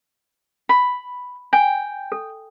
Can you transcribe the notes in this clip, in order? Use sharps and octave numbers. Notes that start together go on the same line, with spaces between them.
B5
G5 G#5
A4